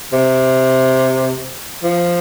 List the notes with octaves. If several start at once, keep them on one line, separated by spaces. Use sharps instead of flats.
C3
F3